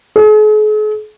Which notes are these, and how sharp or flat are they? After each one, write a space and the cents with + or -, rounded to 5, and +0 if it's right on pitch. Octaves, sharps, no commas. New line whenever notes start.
G#4 +45